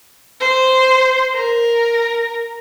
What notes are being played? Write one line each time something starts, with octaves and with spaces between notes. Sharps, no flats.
C5
A#4